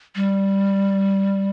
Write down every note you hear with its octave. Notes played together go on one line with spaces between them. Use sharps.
G3